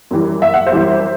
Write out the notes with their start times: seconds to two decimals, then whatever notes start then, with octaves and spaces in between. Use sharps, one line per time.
0.11 F#2 E3 G3
0.42 F#1 E5
0.54 F#5
0.67 C5 E5
0.72 F#2 E3 G3